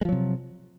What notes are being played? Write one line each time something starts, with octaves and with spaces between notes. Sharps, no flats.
C3 F3 F#3 G#3